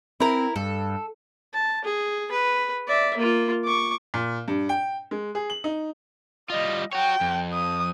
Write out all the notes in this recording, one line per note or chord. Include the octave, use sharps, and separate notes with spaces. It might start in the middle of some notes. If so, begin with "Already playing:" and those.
C4 E4 A#4
G2 A4
A5
G#4
B4
D5 E5
A#3 F4
C#6 D6
A#2
G2
G5
G#3
G#4
F#7
D#4
G3 F4 D#5
F#4 C#5 G5
F2
D#6